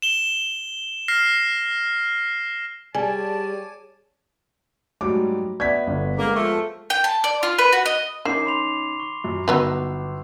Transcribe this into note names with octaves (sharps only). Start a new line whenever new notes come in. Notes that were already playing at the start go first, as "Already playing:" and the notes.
E7 G7
F6 A#6 C7
G3 G#4 C#5 D5 G#5 A5
G#2 F#3 G3 A3 F#4 D6
B3 D5 E5 G#6 B6
G1
G#3 A#3
F3 A3
G5
A5
D5
F4
B4
F#4
D#5
D#3 C#4 D#4 D6 C7 E7
B5 C6 F7
C#6
F#2
G1 F#3 B3 D#4 E6